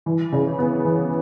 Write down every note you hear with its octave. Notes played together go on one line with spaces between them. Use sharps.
E3
C#3
B3
E3